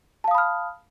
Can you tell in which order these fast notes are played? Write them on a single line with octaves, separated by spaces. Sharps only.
A5 F5 D#6 B5 F6